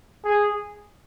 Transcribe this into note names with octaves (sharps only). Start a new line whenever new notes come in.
G#4